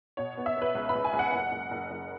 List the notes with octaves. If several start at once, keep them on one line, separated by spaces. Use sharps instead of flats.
B2 C#5
B3
E5
B3
B4
C#2
B5
C#2
G#5
C#2
F#5
F#1
F#1
F#1
F#1